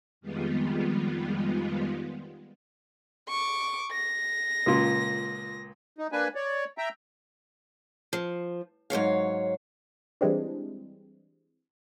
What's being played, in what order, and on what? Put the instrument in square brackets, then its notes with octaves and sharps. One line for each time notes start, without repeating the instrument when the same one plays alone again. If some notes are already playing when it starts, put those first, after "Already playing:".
[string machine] F2 D#3 G3 G#3 B3 F4
[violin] C#6 D6
A#6
[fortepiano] C#2 A#2
[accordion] D#4
A#3 D4 B4 G#5
C#5 D5
E5 G5 A#5
[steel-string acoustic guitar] F3
G#2 F#3 C#5 F5
[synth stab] E3 G3 G#3 C4 D4